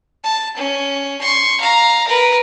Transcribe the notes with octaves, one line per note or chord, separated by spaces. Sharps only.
A5
C#4
C6 C#6
F5 A#5
A#4 B4